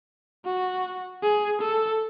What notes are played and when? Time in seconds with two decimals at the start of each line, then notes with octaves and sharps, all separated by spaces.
0.45 F#4
1.23 G#4
1.61 A4